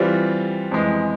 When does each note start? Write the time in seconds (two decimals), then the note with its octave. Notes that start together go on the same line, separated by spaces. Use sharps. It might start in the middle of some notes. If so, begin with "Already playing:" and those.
Already playing: E3 G3 C4 F4
0.71 F2 E3 G#3